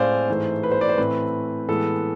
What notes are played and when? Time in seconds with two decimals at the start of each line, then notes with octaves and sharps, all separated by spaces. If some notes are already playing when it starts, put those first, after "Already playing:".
Already playing: A2 G#3 C4 C5 D5 F5 G#5
0.29 G#2 E3 A3
0.63 B4
0.72 C5
0.81 D5
0.89 C5
0.98 A2 E3 A3 C4 B4
1.68 A2 E3 G#3 B3 A4